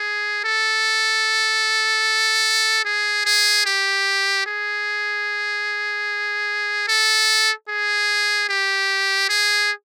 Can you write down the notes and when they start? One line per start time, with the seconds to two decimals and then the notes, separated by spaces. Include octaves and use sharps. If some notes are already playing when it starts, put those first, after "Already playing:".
Already playing: G#4
0.44 A4
2.85 G#4
3.25 G#4
3.66 G4
4.46 G#4
6.88 A4
7.69 G#4
8.49 G4
9.29 G#4